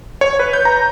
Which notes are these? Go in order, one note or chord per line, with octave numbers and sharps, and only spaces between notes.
C#5
B4
G6
A#5